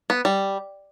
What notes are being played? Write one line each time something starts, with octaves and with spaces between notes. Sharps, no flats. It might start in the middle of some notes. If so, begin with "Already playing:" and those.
B3
G3